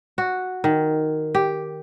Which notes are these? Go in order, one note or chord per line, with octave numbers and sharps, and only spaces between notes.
F#4
D#3
G4